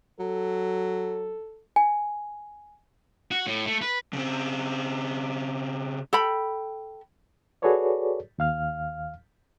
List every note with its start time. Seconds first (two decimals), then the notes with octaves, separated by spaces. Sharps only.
0.20 F#3 A4
1.76 G#5
3.31 F#4
3.47 A2
3.67 A3
3.82 B4
4.13 C#3 C4
6.13 A4 G5 B5
7.62 F#4 G#4 A4 B4 C#5 D5
8.38 D#2 F5 F6